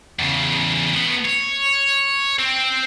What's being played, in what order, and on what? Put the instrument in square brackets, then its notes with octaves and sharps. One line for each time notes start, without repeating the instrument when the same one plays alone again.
[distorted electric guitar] E2 C#3
A2 B3
C#5
C4